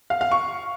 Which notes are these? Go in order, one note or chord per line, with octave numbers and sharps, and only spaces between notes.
F5
F5
C#6